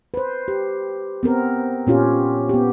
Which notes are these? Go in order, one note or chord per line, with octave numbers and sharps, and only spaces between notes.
B4 C5
G4
B3 C4 A#4
A#2 C#4 F4 G4
B3 G4